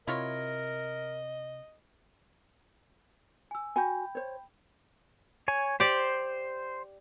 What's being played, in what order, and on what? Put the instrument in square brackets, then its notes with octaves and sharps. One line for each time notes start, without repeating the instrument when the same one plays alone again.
[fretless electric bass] C3 [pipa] E4 F4 C#5 [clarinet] A#4 [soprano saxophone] D#5
[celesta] G#5 E6
[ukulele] F#4 G#5 [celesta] G5 B5 G6
[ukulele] C5 C#5
[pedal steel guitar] C#5 G#5
[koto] G4 D5 [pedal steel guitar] C5